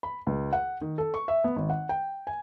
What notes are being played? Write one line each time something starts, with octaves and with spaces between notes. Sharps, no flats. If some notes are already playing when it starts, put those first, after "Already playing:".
B5
C#2
F#5
D#3
A4
C#6
E5
B3
G#1
F#5
G5
G#5